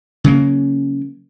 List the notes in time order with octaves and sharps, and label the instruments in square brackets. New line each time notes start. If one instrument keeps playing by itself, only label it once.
[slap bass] C#3 F#3 A#3